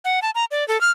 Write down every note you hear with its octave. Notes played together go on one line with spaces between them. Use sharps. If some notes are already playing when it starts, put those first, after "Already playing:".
F#5
A5
A#5
D5
A4
F6